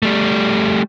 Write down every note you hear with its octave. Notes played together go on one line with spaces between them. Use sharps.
G3 A3